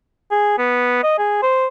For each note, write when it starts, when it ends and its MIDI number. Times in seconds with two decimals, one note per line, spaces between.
0.31 0.54 68
0.58 1.02 59
1.03 1.19 75
1.19 1.38 68
1.43 1.67 72